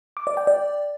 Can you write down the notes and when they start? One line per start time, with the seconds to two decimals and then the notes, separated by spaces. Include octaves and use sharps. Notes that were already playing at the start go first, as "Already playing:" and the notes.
0.17 D6
0.27 D5
0.37 G5
0.47 D5